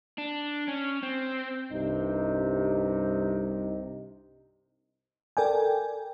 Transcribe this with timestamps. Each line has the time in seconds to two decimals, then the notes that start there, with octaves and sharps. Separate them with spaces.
0.18 D4
0.68 C#4
1.03 C4
1.72 C2 G2 C3 D#4
5.37 A4 A#4 D5 G5 G#5